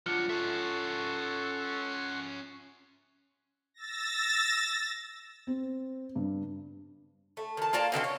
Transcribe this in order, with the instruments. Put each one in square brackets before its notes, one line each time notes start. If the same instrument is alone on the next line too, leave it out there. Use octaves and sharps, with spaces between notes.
[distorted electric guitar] F#3 D4 [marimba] F4 [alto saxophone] F#5
[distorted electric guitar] C#4 E5 [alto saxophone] A4 [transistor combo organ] F#5 C6 C#6
[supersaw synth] E6 A6 A#6
[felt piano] C4
G2
[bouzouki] A3
D#3 A5
A#3 F4 D5 A5
B2 D3 D#3 C4
C#5